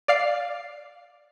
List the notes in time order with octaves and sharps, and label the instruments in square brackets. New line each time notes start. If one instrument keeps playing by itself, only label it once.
[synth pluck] D5 F5 C7